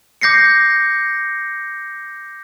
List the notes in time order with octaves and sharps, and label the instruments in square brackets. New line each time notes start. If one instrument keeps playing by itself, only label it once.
[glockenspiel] D6 G6 A#6 C7 C#7